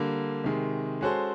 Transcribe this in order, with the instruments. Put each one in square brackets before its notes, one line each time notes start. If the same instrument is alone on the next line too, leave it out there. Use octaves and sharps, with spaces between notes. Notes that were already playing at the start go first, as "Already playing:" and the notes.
Already playing: [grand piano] D3 G3 A#3
C3 D#3 G#3
G#3 C#4 F#4 A4 C5